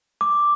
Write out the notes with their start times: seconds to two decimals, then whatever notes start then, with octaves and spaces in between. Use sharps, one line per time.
0.21 D6